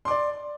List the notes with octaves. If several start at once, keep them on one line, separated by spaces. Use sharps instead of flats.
D5 C6 D6